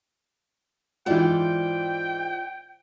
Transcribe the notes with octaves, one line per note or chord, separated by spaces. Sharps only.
G#2 E3 F4 C5 D5 G5